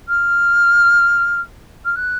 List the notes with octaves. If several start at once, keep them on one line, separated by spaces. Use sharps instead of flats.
F6
F6
F#6